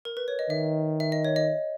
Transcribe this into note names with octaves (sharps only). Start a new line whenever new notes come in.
A#4
B4
C#5
D#5
D#3 E5
E5
D#5
C#5
D#5